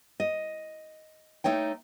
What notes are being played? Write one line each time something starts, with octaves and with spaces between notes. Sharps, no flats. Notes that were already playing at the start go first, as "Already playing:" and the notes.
D#5
A3 D#4 C#5 G5